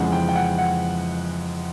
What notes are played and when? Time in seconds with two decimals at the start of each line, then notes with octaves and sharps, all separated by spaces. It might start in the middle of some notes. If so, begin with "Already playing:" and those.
Already playing: F2 C#3 E3 G#3 F#5
0.12 G5
0.29 G5
0.35 F#5
0.58 F#5